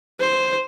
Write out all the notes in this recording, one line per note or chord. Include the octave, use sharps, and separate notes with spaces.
C5